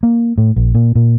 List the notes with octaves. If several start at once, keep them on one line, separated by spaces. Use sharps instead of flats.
A#3
A2
A#1
A#2
A#2